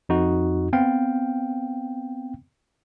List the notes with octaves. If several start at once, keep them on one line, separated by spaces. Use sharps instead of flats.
F2 D#4 F#4
B3 C4 F5 G5